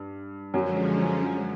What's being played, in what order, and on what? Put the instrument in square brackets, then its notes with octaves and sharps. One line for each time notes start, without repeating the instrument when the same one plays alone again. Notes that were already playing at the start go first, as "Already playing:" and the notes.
Already playing: [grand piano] G2
[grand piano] F#2 F#3 [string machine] D3 F3 G#3 C#4